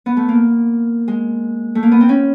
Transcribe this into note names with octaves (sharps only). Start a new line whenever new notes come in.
B3
A3
A#3
G#3
A3
A#3
B3
C4
C#4